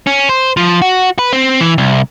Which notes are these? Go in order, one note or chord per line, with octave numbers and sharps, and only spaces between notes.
C#4
C5
F3
F#4
B4
C4
E3
C2